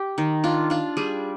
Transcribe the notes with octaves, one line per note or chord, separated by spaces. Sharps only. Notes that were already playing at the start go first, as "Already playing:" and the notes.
Already playing: G4
D#3
D4 F4
D4 F4
G3 G#4